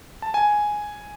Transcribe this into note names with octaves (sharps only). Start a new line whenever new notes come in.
A5
G#5